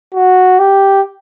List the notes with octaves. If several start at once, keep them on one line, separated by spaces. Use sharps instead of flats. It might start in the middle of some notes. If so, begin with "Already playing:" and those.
F#4
G4